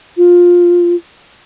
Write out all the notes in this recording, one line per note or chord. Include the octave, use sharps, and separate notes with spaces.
F4